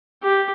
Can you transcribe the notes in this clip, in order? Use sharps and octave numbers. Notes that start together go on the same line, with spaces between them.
G4